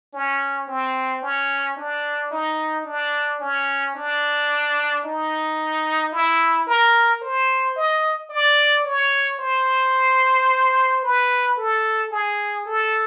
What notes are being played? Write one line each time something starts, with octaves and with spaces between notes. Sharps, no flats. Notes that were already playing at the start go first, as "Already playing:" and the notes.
C#4
C4
C#4
D4
D#4
D4
C#4
D4
D#4
E4
A#4
C5
D#5
D5
C#5
C5
B4
A4
G#4
A4